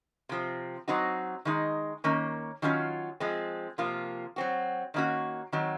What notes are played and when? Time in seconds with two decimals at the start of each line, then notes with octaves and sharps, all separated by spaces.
0.29 C3 F3 C4
0.88 F#3 C4 D#4 F#4
1.45 D#3 G#3 D#4
2.04 D#3 A#3 C#4
2.62 D#3 F#3 C#4 F4
3.20 F3 G#3 C4
3.78 C3 F3 A#3 F4
4.36 F#3 C4 F#4
4.94 D#3 A#3 C#4 F#4
5.52 D#3 F#3 C4